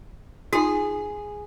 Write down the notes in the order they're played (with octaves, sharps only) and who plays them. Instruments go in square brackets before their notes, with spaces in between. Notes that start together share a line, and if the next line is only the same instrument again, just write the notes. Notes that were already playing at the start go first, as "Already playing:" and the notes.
[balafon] D#4 F4 [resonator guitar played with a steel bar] G#4